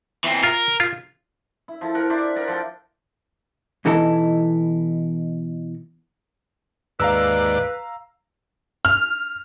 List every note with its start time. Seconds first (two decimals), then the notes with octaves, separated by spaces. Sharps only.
0.24 E3 C4
0.43 F4 A#4
0.80 F4
1.68 E4
1.81 F3 E4 A4
1.94 A#4 F#5
2.10 D4 C5 D5 E5
2.36 A#4 F#5 A5
2.48 F3 A4 G5
3.85 B2 E3 B3 D#4 E4 A4
7.00 D#2 G#2 B4 D5 F5 A#5 E6
8.85 F6